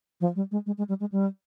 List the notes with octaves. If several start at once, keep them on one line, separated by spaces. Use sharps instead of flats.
F3
G3
G#3
G#3
G#3
G3
G#3
G3